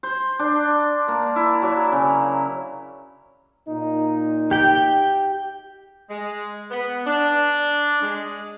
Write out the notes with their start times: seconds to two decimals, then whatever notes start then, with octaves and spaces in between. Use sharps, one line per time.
0.03 C5
0.39 D4
1.08 A#3
1.36 E4
1.62 F#3
1.92 C#3
3.69 A#2 D#4
4.51 G4 G5
6.10 G#3
6.71 B3
7.07 D4
8.02 G#3